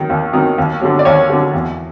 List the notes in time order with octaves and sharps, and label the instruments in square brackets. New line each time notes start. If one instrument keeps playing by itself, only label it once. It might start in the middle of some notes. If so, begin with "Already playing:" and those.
Already playing: [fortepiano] D#3 F#3
D#2
D#3 F#3
D#2
D3 F#3
D5
D#2 C#5
D3 F#3
E2